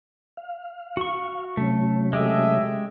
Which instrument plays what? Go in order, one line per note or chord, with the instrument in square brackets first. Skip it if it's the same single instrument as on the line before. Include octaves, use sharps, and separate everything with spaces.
[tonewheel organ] F5
[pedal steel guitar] F#4 C#6
[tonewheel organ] C3 F#3 C#4 [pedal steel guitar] A3
[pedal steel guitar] G#3 G4 G#4 [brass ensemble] A3 D#5 E5